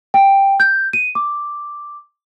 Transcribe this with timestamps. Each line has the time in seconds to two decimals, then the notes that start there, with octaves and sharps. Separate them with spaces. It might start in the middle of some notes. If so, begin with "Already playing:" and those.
0.14 G5
0.60 G6
0.93 D#7
1.15 D6